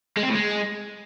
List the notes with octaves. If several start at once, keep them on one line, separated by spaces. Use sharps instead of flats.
G#3
C4
A2
G#3